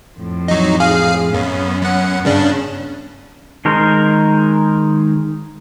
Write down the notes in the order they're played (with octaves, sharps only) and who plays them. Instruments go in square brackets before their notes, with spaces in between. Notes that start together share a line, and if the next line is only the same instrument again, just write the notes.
[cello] F2 A2
[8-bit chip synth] F#3 D#4
G#4 F5
[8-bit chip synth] F#2 [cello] B3 C#4
[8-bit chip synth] F#2 F#5
[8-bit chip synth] G2 C#3 D4 [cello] C#4
[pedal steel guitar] D#3 G#3 A#4 C5